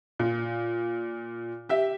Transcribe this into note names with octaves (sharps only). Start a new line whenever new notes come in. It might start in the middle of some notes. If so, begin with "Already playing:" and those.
A#2
G4 E5